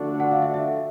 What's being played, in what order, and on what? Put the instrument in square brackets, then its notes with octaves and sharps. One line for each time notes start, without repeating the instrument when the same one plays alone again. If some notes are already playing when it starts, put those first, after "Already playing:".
Already playing: [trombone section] D3 F3 A3 D4 F#4
[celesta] F#5
F5
E5
E5